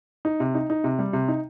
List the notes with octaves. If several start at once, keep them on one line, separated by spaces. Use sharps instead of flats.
D#4
C3
D#4
D#4
C3
G3
C3
D#4